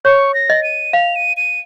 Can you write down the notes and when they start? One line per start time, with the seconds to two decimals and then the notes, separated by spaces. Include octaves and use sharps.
0.05 C#5 C#6
0.34 A#6
0.50 D#5
0.63 D#7
0.93 F5 F7
1.15 D#7
1.37 D#7